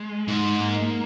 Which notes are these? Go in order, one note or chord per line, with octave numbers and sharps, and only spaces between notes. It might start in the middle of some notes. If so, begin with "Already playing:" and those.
Already playing: G#3
G#2
A#3